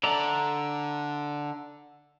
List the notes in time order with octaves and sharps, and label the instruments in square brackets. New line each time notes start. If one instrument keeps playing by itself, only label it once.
[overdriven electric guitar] D3 [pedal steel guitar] D5 E5 A#5